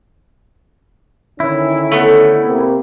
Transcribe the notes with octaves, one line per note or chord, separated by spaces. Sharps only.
D3 D#3 C#4 E4
A3 B3
C3 A#3 C4